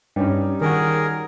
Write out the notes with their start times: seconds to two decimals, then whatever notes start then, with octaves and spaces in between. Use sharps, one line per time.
0.16 G2 G3 C#4 D#4
0.61 D#3 F#4 G#4 A#4